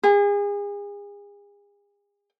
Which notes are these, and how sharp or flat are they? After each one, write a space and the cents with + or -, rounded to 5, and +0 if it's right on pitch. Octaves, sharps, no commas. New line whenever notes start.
G#4 -35